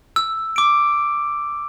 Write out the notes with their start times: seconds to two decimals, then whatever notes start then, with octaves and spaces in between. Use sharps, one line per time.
0.16 E6
0.56 D6 D7